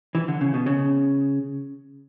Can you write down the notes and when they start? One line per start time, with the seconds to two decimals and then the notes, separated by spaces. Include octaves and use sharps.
0.15 E3
0.28 D3
0.41 C#3
0.54 B2
0.66 C#3